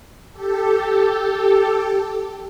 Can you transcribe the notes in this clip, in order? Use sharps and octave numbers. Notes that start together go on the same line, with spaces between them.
G4 A4